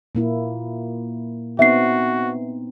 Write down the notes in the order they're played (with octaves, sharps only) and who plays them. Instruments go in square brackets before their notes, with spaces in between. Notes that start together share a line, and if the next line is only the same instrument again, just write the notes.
[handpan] A#2 A#3 E4
[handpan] B3 C4 D#4 [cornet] F#4 [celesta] E5 C7